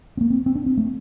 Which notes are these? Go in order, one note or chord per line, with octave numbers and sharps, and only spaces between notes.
C4
A#3
C4
C4
D4
C4
A3